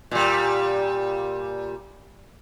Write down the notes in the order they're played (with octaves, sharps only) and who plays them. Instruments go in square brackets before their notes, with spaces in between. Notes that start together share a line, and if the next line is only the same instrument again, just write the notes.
[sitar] A#2 G3